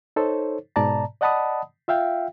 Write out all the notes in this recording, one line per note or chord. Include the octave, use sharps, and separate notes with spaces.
D#4 A4 C5 C#5
G#2 B2 D5 A5 A#5
D5 D#5 F#5 A5 B5 D#6
F4 E5 F5 G5